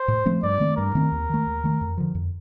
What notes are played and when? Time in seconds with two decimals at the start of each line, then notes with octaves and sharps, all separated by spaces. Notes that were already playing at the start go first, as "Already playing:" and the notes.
Already playing: C5
0.08 A2
0.26 F3 A3 C4
0.43 G2 D5
0.60 D#3 A3 C4
0.77 G2 A#4
0.95 D#3 A3 C4
1.12 D#2
1.29 D#3 A3
1.47 D#2
1.64 D#3 A3
1.81 F2
1.97 D3 F3
2.15 F2